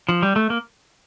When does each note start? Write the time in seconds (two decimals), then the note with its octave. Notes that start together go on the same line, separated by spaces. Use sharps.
0.09 F3
0.23 G3
0.36 A3
0.50 A#3